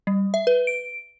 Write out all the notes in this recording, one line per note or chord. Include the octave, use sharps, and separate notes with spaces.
G3
E5
B4
D7